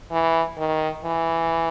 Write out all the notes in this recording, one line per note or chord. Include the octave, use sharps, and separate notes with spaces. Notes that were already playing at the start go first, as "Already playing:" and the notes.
E3
D#3
E3